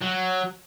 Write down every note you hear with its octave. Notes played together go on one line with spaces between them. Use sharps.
F#3